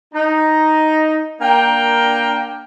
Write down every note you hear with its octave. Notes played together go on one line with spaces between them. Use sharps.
D#4
A#3 D4 A#4 G5